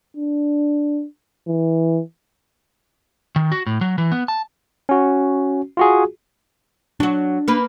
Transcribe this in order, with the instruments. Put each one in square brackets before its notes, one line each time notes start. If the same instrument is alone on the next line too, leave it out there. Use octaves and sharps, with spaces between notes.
[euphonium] D4
E3
[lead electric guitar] D#3
F#4
A2
F#3
E3
B3
A5
[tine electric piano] C#4 F#4
F4 F#4 G#4
[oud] F#3 F#4 [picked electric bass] D4
[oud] A#3 B4